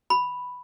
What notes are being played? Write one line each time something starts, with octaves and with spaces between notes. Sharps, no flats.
B5